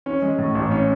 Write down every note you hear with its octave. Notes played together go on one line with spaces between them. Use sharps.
C#4
G#3
A2
A1
C#4